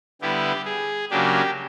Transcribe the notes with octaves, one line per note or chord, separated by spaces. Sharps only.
D3 G3 B3 E4 G4
G#4
C#3 F#3 A#3 D4 G4